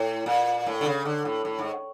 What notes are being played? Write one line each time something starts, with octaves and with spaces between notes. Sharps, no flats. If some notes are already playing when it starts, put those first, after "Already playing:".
Already playing: A2
A#2
A2
D3
C#3
D3
A2
A2
G#2